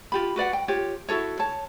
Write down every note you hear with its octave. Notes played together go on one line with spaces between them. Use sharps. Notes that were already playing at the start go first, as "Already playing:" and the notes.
F4 G4 B5
F#4 B4 D5 F#5
G5
F4 G4 C#5
E4 F#4 A4 C#5
C#5 A5